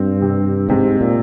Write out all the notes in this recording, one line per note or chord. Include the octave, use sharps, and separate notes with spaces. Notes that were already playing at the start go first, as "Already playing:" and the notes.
Already playing: G2 C4
C3
G#2 C3
A#2